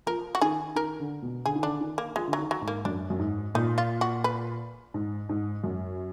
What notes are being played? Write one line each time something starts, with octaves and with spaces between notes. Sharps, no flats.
F3 A#4
F#4
D#3 G#4
D#3 A#4
D3
B2
D3 G#4
D#3
D3 D4
D#3
A#3
F3 G#3
D3
F#3
D#3
F#3
G#2
A#3
F#2 D4
F#2
G#2
A#2 D#4
F4
F#4
B4
G#2
G#2
F#2